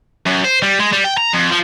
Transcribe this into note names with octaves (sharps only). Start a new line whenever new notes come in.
F#2
C5
G3
G#3
G3
G5
A#5
F2
F3